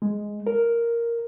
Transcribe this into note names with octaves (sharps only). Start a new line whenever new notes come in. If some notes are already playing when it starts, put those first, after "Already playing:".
G#3
A#4